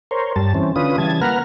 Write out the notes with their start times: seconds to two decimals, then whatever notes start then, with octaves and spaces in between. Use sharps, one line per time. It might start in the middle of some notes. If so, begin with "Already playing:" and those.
0.11 A#4 C5 C#5
0.36 G2 G3 A5
0.54 E3 C4 C#4
0.76 D3 C#4 F4 B4 D#6
0.98 C#3 E3 G3 A5 G#6
1.21 A#3 B4 F#5 A#5 F6